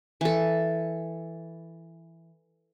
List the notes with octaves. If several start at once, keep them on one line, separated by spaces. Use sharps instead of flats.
E3 A4